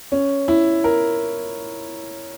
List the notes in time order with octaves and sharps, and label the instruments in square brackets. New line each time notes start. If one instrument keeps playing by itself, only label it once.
[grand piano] C#4
E4
A#4